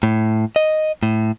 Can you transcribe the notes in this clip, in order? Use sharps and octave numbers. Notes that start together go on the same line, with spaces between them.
A2
D#5
A2